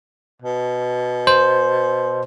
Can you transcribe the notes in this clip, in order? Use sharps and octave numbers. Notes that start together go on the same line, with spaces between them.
B2
C5